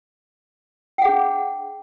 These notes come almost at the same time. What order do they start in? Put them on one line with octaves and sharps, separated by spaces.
G5 F#5 G#4 D4